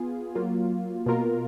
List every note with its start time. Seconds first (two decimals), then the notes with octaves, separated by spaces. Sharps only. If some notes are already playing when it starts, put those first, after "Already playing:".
Already playing: B3 F4 G#4
0.35 F#3 A#3 F4
1.06 B2 A#3 F4 A#4